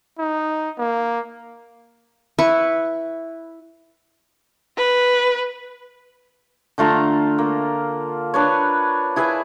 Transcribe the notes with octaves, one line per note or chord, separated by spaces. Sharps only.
D#4
A#3
E4 B4 C#6
B4
D3 A3 F4 A#5
A#3
D4 B4 C#5
E4 G#4 B4 E5